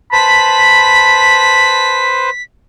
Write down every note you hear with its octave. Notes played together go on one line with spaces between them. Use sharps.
B4 C5 A5 B5 B6